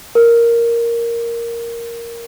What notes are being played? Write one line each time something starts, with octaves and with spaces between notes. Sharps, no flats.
A#4